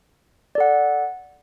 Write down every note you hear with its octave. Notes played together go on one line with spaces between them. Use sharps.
A4 D5 F#5